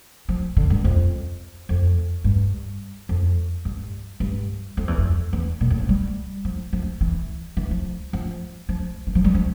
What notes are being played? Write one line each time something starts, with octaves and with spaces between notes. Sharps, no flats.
F3
D3
G2
F2
F2
G2
F2
G2
G2
F2
E2
F2
E2
A#2
A2
F3
G3
F3
F3
E3
E3
F3
F3
F3
E3
F3
G3
F3